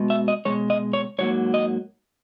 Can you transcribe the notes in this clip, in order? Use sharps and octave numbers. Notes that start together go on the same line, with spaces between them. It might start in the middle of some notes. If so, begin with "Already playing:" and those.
Already playing: B2 G#3
E5
D#5
B2 G#3 C#5
D#5
C#5
G#2 F#3 A#3 C#5
D#5